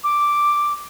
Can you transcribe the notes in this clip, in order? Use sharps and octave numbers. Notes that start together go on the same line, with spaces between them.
D6